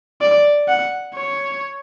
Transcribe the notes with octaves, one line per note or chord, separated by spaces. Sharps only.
D5
F#5
C#5